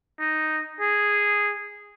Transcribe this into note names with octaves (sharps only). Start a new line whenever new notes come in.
D#4
G#4